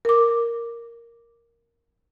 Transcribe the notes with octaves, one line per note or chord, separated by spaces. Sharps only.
A#4 D6